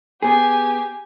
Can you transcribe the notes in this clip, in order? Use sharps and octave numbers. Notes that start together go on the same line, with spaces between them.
B3 G4 G#4 G#5